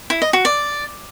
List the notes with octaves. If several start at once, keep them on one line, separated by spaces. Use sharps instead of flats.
E4
D#5
F#4
D5